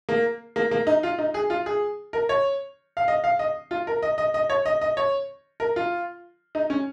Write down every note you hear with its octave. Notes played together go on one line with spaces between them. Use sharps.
A#3
A#3
A#3
D#4
F4
D#4
G#4
F4
G#4
A#4
C#5
F5
D#5
F5
D#5
F4
A#4
D#5
D#5
D#5
C#5
D#5
D#5
C#5
A#4
F4
D#4
C#4